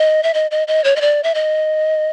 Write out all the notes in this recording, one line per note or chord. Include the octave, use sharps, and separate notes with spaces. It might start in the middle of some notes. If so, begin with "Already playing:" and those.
Already playing: D#5
E5
D#5
D#5
D#5
C#5
D#5
D5
E5
D#5